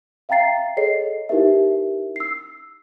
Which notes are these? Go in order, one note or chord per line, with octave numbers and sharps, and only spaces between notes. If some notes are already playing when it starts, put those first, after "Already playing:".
E5 F5 G5 A#5 A6 C7
G#4 A4 C#5 D#5 C7
D#4 E4 G4 A#4 B4 E5
E6 C7